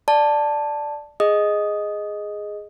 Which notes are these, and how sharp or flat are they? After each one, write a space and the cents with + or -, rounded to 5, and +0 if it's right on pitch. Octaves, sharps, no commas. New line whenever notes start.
D5 +0 A5 +0
G#4 +0 D#5 +0 D#6 +0